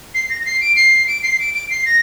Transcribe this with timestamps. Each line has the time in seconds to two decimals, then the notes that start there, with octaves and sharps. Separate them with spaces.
0.15 C7
0.30 A#6
0.41 A#6
0.45 C7
0.61 D7
0.76 C7
1.07 D7
1.23 C7
1.39 D7
1.54 D7
1.70 C7
1.86 A#6